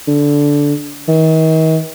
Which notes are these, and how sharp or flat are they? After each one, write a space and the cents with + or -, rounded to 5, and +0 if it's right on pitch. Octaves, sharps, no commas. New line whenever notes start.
D3 -15
D#3 +40